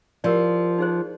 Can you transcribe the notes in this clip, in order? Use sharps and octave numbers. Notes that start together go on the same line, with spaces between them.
F3 G4 A#4 D5
D#4 G#4 C5